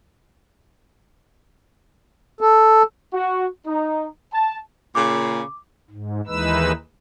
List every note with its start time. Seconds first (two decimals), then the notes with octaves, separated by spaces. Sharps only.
2.41 A4
3.13 F#4
3.66 D#4
4.33 A5
4.95 A#2 C#3 D6
5.90 G#2
6.27 D#2 E3 G#3 D#4 B4 E6